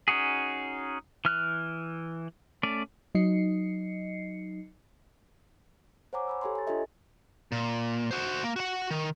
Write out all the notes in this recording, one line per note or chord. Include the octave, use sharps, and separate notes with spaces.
C#4 D#4 F#4 G#4
E3 F6 F#6
A3 C#4 D5
F#3 D#4 D#5 C7 C#7
C5 C#5 F#5 G#5 A#5 D6
G#5 B5 E6
G4 A4 C#5 G#5 A#5 C6
G#5 A6
D4 F4 G4 A4 D#5 E5
A#2
F#4 C5
A#3
F#4 F#5
D#3